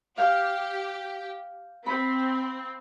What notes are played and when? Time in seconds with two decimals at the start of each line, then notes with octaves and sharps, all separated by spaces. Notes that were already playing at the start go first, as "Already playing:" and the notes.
0.18 G4 F5 G5 F6
1.86 C4 B5